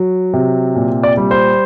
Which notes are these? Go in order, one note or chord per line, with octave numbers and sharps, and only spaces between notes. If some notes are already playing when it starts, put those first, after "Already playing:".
Already playing: F#3
C3
A#2
D5
G3
C5